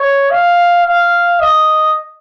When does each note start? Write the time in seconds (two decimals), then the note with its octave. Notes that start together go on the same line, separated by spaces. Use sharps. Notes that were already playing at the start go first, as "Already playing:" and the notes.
Already playing: C#5
0.30 F5
0.85 F5
1.40 D#5